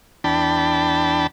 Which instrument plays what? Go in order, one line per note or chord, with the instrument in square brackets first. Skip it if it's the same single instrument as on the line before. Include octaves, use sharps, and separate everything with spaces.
[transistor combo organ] E2 D4 G5 A5 B5